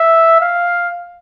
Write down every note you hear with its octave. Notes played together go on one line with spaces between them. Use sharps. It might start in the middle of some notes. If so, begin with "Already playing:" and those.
Already playing: E5
F5